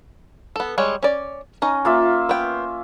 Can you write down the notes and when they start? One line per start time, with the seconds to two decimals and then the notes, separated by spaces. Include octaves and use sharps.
0.56 B3 A4
0.78 G3 G#3 C#5
1.03 C#4 D5
1.62 C#4 D#4 A#5
1.85 A#3 F4 E5
2.29 B3 G5